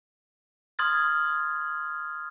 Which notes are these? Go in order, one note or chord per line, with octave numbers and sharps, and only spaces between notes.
C6 D#6 F6 G#6 A6